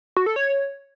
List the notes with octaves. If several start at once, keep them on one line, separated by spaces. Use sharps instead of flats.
F#4
A4
C#5